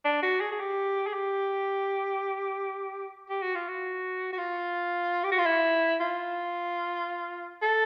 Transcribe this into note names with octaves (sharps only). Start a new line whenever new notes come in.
D4
F#4
G#4
G#4
G4
G#4
G4
G4
F#4
F4
F#4
F#4
F4
G4
F#4
F4
E4
F4
A4